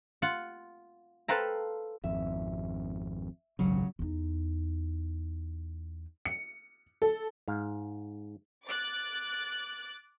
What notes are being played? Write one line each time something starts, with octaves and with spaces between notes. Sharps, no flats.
F4 F#5
A4 B4 C5 F5 G5 A#5
G#1 F2 E5
G#1 C#2 F#2 C#3 F#3
E2 D#4
C#7
A4
G#2 F5
D6 F#6 A6